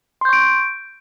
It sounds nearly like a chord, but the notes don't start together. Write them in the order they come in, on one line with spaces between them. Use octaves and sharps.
C6 G6 C#6 D7